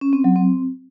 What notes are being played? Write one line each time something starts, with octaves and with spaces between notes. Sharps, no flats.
C#4
C4
F#3
C4